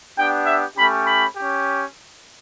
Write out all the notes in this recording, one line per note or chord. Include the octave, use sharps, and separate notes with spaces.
B3 D4 G4 G5
E5
A3 C#4 G4 B5
B5
C#4 G4